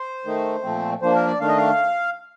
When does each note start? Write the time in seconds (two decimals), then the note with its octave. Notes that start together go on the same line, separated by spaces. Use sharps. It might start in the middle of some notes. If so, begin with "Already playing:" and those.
Already playing: C5
0.25 D#3 A3 D#4
0.63 A#2 F3 A3 C4
1.02 F3 A#3 D4 C5
1.15 A#4
1.27 D5
1.40 D#3 A3 D4 F5
1.48 D#5
1.57 F5